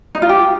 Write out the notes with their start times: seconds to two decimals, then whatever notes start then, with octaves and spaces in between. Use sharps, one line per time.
0.15 D#4
0.22 F4
0.29 G4